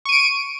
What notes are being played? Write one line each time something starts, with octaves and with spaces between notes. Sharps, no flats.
C#6 D7 D#7